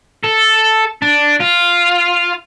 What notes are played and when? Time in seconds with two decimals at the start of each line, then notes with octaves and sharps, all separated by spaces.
0.23 A4
1.02 D4
1.40 F4